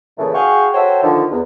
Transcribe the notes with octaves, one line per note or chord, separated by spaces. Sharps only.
A#2 C#3 E3 A3
F#4 G#4 F5 G5 G#5 C#6
F#4 A4 C5 C#5 E5 G5
D3 D#3 F3
E2